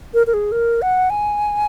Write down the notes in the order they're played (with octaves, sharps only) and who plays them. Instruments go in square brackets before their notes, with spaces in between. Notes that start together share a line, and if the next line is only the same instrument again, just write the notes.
[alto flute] A#4
A#4
G#4
A#4
F#5
G#5